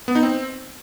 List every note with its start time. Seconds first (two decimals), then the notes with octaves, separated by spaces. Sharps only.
0.08 B3
0.15 D#4
0.23 C4